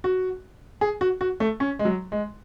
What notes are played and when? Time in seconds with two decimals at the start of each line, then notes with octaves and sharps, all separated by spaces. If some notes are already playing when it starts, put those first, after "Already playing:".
0.04 F#4
0.81 G#4
1.01 F#4
1.21 F#4
1.40 A3
1.60 C#4
1.79 G#3
1.85 F#3
2.12 G#3